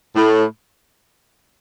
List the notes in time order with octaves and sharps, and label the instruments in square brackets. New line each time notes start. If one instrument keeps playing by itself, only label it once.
[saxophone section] A2